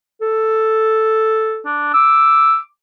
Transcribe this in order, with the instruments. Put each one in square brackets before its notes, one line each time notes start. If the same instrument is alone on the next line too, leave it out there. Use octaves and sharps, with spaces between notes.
[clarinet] A4
[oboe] D4
[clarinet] D6 [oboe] E6